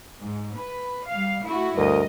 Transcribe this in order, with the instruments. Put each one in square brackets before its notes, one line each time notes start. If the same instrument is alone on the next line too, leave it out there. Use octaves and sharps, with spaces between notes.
[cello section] G#2
B4
G3 F5
A3 E4 F#4
[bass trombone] D2 [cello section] G2 D#5 [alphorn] A#4